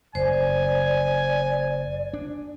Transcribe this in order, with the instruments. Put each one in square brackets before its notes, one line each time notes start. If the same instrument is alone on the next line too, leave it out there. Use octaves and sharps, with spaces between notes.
[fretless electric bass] F#1 [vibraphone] C5 [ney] D5 [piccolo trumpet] G#5
[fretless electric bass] D4